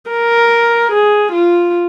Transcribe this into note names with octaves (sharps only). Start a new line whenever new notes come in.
A#4
G#4
F4